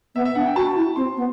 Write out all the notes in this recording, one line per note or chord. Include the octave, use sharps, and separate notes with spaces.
B3 E5
E5
D4 F#5
G5
F#4 A5
E4
C4 C6
B3